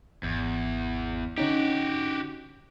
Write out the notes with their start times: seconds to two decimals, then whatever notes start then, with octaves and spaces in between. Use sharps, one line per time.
0.23 G#1 E2
1.38 D3 C#4 D#4 F#4 G4